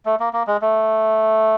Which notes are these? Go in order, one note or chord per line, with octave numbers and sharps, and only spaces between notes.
A3
A#3
A#3
G#3
A3